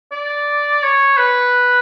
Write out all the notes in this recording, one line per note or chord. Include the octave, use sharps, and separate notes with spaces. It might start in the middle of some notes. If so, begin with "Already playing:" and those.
D5
C#5
B4